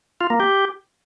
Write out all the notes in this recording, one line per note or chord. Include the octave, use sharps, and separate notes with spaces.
F4
A#3
G4